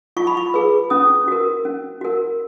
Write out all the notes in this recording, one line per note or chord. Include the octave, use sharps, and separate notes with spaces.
F4 C#6
B5
C#6
G#4 B4
C#4 D#6
F#4 A#4
C#4
F#4 A#4